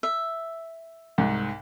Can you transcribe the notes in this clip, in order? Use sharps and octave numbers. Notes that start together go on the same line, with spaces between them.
E5
C2 G#2